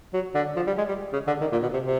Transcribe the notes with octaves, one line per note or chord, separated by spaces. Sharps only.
F#3
D3
F3
G3
G#3
G3
C#3
D3
D#3
A#2
B2
C3
C3